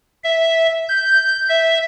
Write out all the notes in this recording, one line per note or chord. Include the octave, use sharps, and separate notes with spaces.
E5
G6
E5